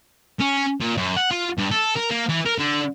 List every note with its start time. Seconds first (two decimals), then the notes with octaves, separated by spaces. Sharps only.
0.40 C#4
0.81 A#2
0.98 F#2
1.17 F#5
1.31 F4
1.58 G2
1.71 A4
1.96 A#4
2.10 A#3
2.29 E3
2.45 A#4
2.58 D3